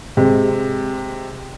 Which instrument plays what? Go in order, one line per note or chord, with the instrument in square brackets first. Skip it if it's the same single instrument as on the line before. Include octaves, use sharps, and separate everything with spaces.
[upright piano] C3 G#3